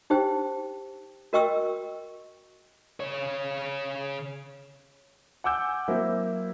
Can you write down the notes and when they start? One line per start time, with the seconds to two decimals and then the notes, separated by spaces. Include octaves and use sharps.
0.10 D#4 G4 C5 G5
1.33 F#4 A#4 D#5 G5 C#6 E6
3.00 C#3 C#5
5.44 F#5 G#5 D6 E6 G6
5.88 F#3 A#3 C4 E4